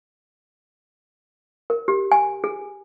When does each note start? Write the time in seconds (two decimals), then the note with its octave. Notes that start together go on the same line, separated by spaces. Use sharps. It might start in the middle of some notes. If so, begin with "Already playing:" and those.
1.70 A#4
1.88 G4
2.12 G#5
2.44 G#4